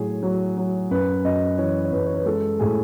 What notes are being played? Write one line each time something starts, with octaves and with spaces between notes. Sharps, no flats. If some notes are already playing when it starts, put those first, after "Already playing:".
Already playing: A2 F#3 G#4
F#3
F#3
F#2 B4
F#2 D#5
E3 C#5
C#5
F#2 B4
C#5
B4
G#3 A4
A2 G#4